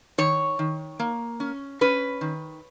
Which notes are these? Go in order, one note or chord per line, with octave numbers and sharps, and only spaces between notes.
D#3 C#5
D#3
A#3
C#4
C#4 B4
D#3